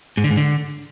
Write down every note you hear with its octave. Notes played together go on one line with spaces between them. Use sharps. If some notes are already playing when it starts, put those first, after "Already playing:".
G#2
D3
G#2
D3